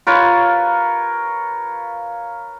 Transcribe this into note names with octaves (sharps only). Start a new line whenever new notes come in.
F4 A#4 B4 C#5